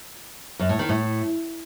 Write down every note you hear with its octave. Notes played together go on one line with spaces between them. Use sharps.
F#2
A2
D#3
A2